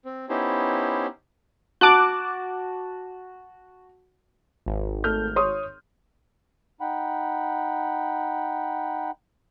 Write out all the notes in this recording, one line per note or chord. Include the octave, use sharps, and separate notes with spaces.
C4
B3 C#4 D#4 E4 G4 C5
F#4 A5 D6 F#6
G#1
A3 F6 G6
C#5 C6 D#6
D#4 F#5 G5 B5